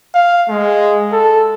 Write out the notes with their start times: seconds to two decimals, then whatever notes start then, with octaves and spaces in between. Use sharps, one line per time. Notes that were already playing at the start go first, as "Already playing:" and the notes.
0.15 F5
0.49 G#3
1.13 A4